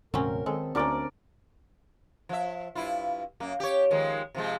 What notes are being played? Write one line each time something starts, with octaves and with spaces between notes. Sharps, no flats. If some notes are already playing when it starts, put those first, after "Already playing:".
E1 A2 C#3 F#3 C4 C#4 A#4
D#3 G#3 C4 A4
D2 D3 A#3 C#4 D4 A#4 D5
F3 E5
G2 E4 F4
F#2 A#3
G4 C#5
D#3 F3 G#3
C3 F3 G#3